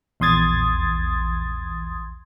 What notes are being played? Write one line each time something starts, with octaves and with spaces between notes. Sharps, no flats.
A#1 E2 C6 D#6 G#6 A6